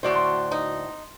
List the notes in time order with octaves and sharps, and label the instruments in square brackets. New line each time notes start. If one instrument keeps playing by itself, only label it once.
[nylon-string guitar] D2 D5 [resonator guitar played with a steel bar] A2 F#4 C5
[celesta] C6
[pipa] D#4